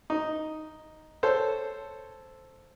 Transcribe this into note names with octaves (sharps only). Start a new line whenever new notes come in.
D#4
A4 C5 C#5